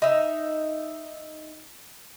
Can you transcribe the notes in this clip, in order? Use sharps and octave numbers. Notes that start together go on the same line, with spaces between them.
D#4 E5